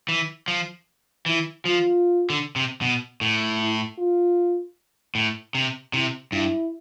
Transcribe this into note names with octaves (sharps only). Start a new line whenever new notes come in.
E3
F3
E3 E4
F3 F4
D3
C3
B2
A2
E4
F4
A2
C3
C3 E4
G2 E4